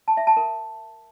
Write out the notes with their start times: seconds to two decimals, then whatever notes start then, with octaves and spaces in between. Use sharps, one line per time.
0.08 A5
0.17 E5
0.27 A5
0.37 A#4